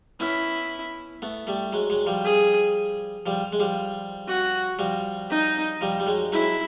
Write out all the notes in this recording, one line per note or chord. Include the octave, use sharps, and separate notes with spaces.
B3 C#4 E4
A3 B3
G3 A3
F#3 G#3
F#3 G#3
F3 G3
G#4
F3 G3
G#3
F3 G3
F#4
F3 G3
D#4
F3 G3
G3
F#3 G#3
F#3 G#3 E4